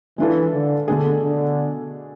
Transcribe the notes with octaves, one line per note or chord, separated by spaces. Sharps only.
E3 G#3 D4 F4 A4
D3
B2 D3 A3 D4 G#4
D3